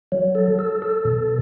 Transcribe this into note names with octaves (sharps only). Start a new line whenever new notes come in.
F#3
A4
A4
A4
B2